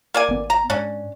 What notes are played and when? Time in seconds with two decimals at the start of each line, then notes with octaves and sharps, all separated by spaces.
0.14 A#3 D5 G#5
0.28 G#1 B3
0.50 A#5
0.70 G#2 C#4 D4